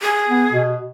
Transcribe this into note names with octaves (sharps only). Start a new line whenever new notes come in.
G#4
B3
B2